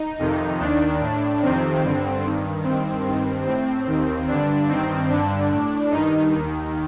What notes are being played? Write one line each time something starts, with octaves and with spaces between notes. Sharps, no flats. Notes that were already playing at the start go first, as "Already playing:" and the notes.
Already playing: D#4
F2 C3 D#3
D#2 D#3 D4
A2
F2 C3 D#3 C4
G2 D3
G2 D#3
G2 D#3 C4
G2 D#3
A2 C4
D#2 D#3
G2 D3 D4
G2 D#3 C4
G2 D3 D4
A2
G2 D#3 D#4
D#2 D#3